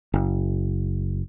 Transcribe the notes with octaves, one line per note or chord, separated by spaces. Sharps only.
F#1